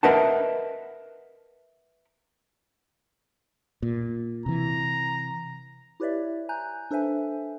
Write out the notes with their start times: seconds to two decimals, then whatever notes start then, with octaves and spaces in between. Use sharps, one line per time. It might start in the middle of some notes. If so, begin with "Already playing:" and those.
0.03 A#4 B4 D#5 E5 F#5 A5
3.83 A#2
4.46 C3 E3 A#5
6.00 E4 G4 B4 C#5 D5 E5
6.49 G#5 A#5 F#6 G6
6.91 D4 A4 B4 C5 E5 G#5